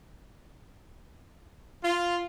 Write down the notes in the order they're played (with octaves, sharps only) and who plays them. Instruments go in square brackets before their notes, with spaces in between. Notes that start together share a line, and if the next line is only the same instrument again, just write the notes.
[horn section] F4